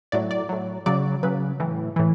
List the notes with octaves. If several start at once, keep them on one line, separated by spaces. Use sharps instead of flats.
A2 F#3 D5
D5
A2 F#3
C#3 F#3 D5
C#3 F#3 B4
A2 E3
A2 E3